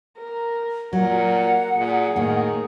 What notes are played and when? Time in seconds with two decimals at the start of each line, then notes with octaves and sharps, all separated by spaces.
0.18 A#4
0.93 A#2 F#3 F#4 A#4 F#5
1.76 A#2 G#4
2.16 A2 D#3 A#3